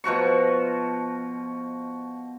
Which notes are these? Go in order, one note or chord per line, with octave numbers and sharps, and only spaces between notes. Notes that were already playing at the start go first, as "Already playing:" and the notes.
B2 F3 F#4 C#6